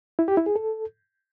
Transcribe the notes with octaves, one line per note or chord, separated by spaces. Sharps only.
E4
G4
E4
G#4
A4